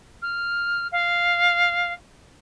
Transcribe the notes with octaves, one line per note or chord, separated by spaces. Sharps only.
F6
F5